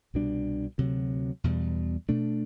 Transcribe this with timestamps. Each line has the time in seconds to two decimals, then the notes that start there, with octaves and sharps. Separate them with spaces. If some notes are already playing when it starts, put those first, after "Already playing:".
0.14 C2 B2 G3 D4
0.78 D2 C3 F#3
1.44 E2 B2 G3
2.09 B2 A3 D4